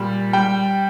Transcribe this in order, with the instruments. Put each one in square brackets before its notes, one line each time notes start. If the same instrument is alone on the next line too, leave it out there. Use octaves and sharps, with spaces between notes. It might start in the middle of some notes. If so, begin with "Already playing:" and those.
Already playing: [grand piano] A#2 G3
G3 G5